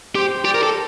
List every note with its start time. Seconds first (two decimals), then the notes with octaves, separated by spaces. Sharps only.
0.15 G4 C5
0.44 G4 D5
0.54 A#4
0.63 A4